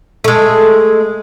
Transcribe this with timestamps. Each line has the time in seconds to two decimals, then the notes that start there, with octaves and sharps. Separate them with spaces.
0.24 G#3 A3